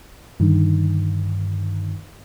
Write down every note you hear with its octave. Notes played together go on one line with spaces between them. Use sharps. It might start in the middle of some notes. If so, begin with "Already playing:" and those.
G2 D3 D#3